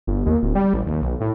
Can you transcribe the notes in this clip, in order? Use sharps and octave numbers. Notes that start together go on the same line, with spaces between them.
G1
D#2
D1
G3
A1
D#2
B1
A2